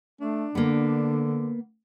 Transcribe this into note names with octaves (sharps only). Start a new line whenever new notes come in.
A3 D4
D3 A#3 B3